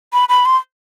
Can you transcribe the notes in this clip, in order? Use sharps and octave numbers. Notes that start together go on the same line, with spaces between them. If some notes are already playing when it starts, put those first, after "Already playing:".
B5
B5
C6